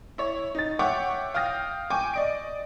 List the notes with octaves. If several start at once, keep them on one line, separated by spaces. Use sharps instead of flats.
E4 C#5
D#4 A6
C#5 E5 F#5 G5 C#6 D6
F5 G5 D#6 F6 A#6
G5 G#5 C#6 D6
D5 D#5 D7